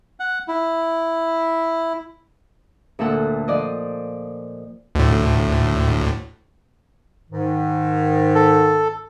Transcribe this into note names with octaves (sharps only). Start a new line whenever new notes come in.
F#5
E4
D2 A#2 A4 F#5
F3 D5 D#5
D2 A2
G#2 D#3
A4